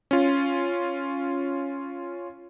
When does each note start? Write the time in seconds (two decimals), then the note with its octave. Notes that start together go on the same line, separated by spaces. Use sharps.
0.11 C#4 F4